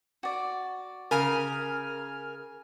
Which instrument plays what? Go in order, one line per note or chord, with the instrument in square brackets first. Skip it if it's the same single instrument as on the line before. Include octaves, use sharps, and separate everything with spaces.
[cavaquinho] F#4 D5
[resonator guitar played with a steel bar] C#3 [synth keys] A#4 G#5 F6